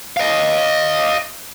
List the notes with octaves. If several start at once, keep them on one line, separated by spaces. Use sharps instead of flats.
D#5 F5